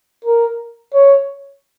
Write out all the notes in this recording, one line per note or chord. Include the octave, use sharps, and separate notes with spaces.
A#4
C#5